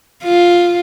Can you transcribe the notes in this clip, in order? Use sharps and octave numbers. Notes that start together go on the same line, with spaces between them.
F4